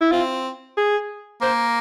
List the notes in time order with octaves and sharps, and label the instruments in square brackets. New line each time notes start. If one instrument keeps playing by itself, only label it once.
[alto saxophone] E4
[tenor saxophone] C4 [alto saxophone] F4
[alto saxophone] G#4
[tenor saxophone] A#3 [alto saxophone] C5